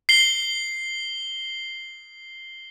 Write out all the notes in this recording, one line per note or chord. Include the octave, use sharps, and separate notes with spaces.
C7 G7